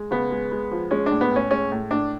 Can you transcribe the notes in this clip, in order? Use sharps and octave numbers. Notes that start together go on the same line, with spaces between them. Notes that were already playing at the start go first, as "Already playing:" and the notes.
Already playing: G#3
C#3 B3
G#3
G#3
F3
G#3 C#4
A2 D4
B3
A2 C#4
G#3 C#4
A2
A2 D4